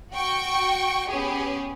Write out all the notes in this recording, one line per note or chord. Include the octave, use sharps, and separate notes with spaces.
F#4 G5 C#6
B3 C#4 G4 G#4